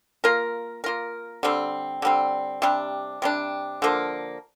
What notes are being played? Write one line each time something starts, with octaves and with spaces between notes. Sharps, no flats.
A#3 F4 A#4
A#3 F4 A#4
D3 G3 C4
D3 G3 C4
C3 G3 D4
C3 G3 D4
D3 F3 A#3